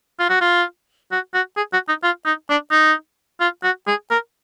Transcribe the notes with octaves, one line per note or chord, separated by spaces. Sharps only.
F4
F#4
F4
F#4
F#4
G#4
F#4
D#4
F4
D#4
D4
D#4
F4
F#4
G#4
A#4